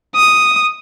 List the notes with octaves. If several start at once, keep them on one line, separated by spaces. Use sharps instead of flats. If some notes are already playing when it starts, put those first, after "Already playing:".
D#6